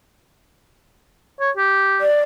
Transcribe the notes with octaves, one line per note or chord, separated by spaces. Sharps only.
C#5
G4
D5